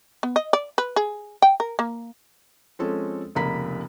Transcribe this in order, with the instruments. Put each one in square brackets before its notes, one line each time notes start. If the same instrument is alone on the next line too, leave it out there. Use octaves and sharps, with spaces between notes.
[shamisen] B3
D#5
D5
B4
G#4
G5
A#4
A#3
[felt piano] F3 G#3 C4 C#4 A4
F1 C#2 A#3 A#5 B5 B6